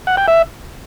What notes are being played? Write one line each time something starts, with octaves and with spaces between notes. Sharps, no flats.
F#5
G5
E5